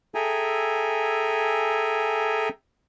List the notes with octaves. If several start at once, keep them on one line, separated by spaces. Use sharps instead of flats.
G#4 A4 E5 G5 G#5 A#5